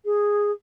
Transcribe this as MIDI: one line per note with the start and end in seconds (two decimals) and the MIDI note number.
0.05 0.51 68